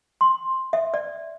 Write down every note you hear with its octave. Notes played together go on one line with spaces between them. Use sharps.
C6
E5
D5